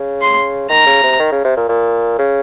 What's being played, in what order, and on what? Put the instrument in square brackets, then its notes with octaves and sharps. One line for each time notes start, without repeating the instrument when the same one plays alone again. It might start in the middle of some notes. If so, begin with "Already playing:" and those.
Already playing: [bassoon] C#3
[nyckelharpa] C6
[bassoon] D#3 [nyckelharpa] A#5
[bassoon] C#3
C3
D#3
C#3
C3
A#2
A#2
C#3